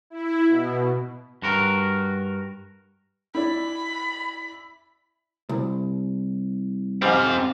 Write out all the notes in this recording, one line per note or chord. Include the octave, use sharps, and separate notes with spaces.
E4
B2
G2 F#4 A#4
E4 D5 B5
C2
G#2 G3 C4 F5